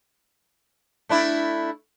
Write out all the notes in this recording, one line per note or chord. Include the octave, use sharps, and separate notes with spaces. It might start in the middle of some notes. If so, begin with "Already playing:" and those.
A3 D4 E4